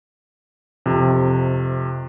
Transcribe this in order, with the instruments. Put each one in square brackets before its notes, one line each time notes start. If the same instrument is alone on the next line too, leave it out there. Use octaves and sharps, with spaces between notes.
[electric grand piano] F2 C3